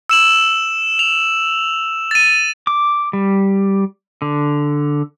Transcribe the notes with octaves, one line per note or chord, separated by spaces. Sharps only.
E6 E7 F#7
F7
A6 D#7
D6
G3
D3